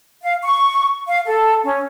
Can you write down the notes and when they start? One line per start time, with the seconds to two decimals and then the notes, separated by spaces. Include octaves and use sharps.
0.23 F5
0.43 C#6
1.08 F5
1.26 A4
1.64 C#4